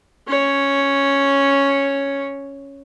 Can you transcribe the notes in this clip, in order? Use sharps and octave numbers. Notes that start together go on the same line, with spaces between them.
C#4 C#5